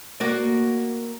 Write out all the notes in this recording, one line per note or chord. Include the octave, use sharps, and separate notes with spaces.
A#3 F#4 D5